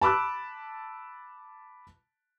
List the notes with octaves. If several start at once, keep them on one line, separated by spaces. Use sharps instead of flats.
A5 B5 D6 E6 F#6